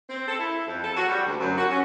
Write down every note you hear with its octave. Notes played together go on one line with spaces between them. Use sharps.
C4
A4
E4
F2
A4
F#4
G3
D2
F#2
F#4
C#4